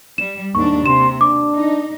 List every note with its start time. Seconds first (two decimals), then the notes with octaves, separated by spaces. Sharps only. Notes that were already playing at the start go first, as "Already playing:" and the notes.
0.18 G3 E7
0.55 D#2 G#2 D4 C#6
0.86 C3 C6 E7
1.21 D4 D6
1.54 D#4